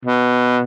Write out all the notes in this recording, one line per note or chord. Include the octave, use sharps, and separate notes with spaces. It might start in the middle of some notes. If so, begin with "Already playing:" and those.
B2